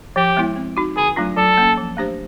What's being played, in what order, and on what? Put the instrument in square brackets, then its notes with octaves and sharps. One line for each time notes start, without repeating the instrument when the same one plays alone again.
[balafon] F3 [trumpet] G4
[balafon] G#3 B3 E4
C4
D#4 F#4
[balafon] D3 [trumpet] G#4
[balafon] F#3 A3 D4 F4
[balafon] F#3 [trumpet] A4
[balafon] A#3 C#4
F3
A3 D4 G4 C5